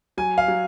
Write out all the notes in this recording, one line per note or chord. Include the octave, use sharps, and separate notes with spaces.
F#3 G#5
F5
F#3